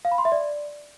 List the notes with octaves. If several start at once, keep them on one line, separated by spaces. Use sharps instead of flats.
F5
B5
C6
E5
D5